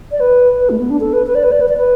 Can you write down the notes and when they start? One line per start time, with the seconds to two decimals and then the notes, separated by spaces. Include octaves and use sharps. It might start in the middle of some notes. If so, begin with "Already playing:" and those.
0.12 D5
0.20 B4
0.60 B4
0.70 A3
0.80 B3
0.90 D4
1.00 A4
1.13 B4
1.27 B4
1.35 D5
1.44 B4
1.52 D5
1.61 B4
1.69 D5
1.78 B4